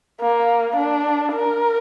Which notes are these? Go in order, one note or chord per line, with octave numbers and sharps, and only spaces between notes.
A#3
D4
A#4